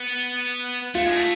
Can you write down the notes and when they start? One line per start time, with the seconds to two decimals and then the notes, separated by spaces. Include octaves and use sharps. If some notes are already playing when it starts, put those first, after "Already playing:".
Already playing: B3
0.95 A3 F4
1.06 G#3
1.15 A3